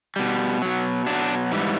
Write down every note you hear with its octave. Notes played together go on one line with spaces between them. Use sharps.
B2 G3
B2 F#3
B2 F#3 D4
G#2 E3 G3